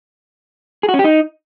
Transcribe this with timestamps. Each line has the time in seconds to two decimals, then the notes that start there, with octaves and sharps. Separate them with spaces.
0.83 G#4
0.89 F#4
0.94 C#4
0.99 G4
1.04 D#4